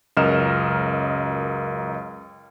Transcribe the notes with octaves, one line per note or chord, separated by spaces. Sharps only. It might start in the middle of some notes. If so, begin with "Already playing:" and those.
C#2 F#2 A#4 D#5 F6 E7